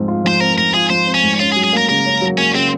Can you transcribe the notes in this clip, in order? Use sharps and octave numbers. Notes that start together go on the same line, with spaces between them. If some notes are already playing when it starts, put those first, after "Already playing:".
Already playing: G#2 F3 C4
F4
F3 C5
C4 A#4
G#2 A#4
F4 G#4
F3 C5
C4
C#4
G#2
C#4 F4
G#4
F#3
G#4
A#3 A#4
C#3 A#4
C#4
F#3
A#3 C#4
C#3 C4